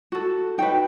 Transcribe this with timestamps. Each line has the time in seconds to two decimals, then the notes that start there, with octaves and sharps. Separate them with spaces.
0.12 F#4 A4
0.58 D#4 F#4 B4 G5